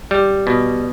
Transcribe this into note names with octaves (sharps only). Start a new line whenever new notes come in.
G3
B2